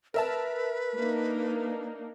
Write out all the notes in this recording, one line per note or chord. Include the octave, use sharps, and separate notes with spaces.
A#4 B4 E5 A5
A#3 D4 D#4